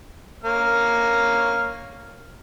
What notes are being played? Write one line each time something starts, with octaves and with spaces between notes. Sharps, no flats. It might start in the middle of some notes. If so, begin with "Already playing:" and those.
A#3 C#5 F6